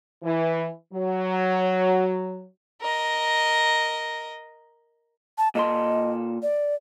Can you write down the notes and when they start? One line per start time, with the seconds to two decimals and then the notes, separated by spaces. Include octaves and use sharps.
0.23 E3
0.93 F#3
2.81 A#4 D#5
5.38 A5
5.55 A#2 A4 D#5 C6
6.43 D5